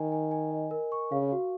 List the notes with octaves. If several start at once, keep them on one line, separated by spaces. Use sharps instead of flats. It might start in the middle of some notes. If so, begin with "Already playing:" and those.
Already playing: D#3 G#5
G#5
G#5
D#5
A#4
C#6
C#3 F5
F#4